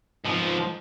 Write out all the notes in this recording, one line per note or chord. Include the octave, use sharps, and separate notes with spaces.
G#2 F3